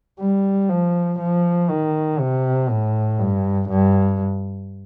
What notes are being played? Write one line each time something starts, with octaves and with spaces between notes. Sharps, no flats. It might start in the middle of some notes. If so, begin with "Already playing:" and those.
G3
F3
F3
D#3
C3
A2
G2
G2